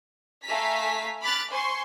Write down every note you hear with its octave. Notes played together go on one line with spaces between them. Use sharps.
A3 F5 G#5 A#5 B6
B5 D6 F6 F#6 A6
C5 G#5 C6 C#6